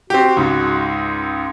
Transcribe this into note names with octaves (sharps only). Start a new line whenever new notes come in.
C4 F#4 G4
C#2 G#2